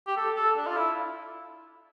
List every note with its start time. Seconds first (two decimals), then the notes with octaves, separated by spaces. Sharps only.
0.07 G4
0.17 A4
0.36 A4
0.57 D4
0.67 F4
0.77 E4